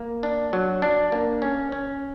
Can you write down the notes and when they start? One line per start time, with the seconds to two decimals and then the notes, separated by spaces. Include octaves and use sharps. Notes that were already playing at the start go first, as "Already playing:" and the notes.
Already playing: A#3
0.23 D4
0.53 F#3
0.82 D4
1.12 A#3
1.42 C#4
1.72 C#4